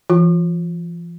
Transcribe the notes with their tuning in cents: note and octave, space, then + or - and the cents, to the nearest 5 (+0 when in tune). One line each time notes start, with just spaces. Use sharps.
F3 -45 F4 +35